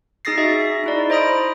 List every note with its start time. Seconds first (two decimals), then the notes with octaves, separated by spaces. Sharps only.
0.25 D#4 G#4 D#6 A6 A#6 C7
0.37 F#4 G#4 D#5 E5
0.84 D#4 E4 D5
1.10 C5 D#5 A#5 B5 D#6 D7